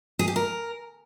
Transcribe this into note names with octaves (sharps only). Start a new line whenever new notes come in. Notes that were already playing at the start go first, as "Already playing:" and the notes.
G#4
G4
A#4